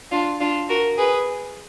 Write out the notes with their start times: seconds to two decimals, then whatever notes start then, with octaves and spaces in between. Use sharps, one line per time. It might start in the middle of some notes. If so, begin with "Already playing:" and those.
0.11 D4 F4
0.40 D4 F4
0.68 F#4 A#4
0.97 G#4 B4